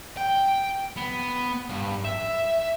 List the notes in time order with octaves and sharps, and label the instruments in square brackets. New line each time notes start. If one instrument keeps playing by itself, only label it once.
[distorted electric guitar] G5
B3
G2
E5